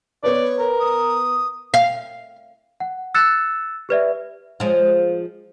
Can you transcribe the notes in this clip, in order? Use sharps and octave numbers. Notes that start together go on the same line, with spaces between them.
B3 B4 C#5 D5
A#4
D#6
F5
F#5
E6 F#6 A6 C#7 E7
G4 B4 D5 E5
F3 G#3